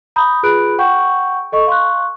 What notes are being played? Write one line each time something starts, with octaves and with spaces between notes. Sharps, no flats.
A#5 B5 D#6 G6
F4 G#4 B4 B5 F#6 D7
F#5 G5 C#6 G6
A4 D#5 C#6
F5 C6 C#6 F#6